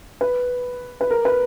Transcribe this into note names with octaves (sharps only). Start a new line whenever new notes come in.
B4
B4
A#4
B4